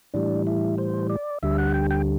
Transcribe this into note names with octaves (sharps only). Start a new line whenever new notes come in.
A2 E3 G3 D4
E4
C5
D5
D2 D3 G3 E5
F#5
G5
G5